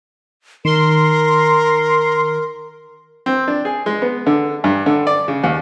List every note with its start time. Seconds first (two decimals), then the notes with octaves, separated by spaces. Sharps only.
0.65 D#3 A#4 C6
3.26 C4
3.48 D4
3.65 G#4
3.86 G#3
4.02 B3
4.26 D3
4.64 G2
4.86 D3
5.07 D5
5.28 C#3
5.44 D#2